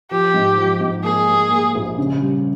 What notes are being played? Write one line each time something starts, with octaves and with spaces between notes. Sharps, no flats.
F3 G4
G#2
F3
G#2
A#3 G#4
A#3
A#3
A#1
C#3
G3